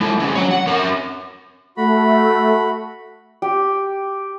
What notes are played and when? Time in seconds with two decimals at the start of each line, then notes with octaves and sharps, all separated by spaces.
0.01 G#3 E4
0.19 D2 C#4
0.35 F#3 C#5
0.51 F#5
0.67 C#4 A#4
1.77 A3 F#4 B5
3.42 G4